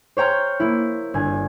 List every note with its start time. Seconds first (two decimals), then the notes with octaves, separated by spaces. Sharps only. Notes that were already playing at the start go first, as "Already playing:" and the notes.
0.17 C5 C#5 G5 A#5 F6
0.60 A#3 E4
1.14 G1 G#5